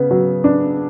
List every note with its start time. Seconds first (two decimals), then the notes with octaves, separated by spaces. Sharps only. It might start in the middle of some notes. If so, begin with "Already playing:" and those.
Already playing: C#3 B3
0.11 F#3
0.44 D4